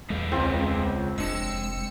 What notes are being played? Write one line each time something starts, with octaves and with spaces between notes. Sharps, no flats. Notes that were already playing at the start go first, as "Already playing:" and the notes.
E2 G#3 B3 A4 F5
C#2 C4
F1 G#3 D4 E6 C#7 E7